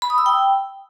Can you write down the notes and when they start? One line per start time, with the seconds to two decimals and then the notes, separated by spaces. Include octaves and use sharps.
0.02 B5
0.10 D#6
0.18 E6
0.26 G5